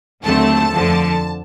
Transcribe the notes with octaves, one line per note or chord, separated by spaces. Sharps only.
D#2 D3 F#3 A3 C4 A5
F2 D3 F3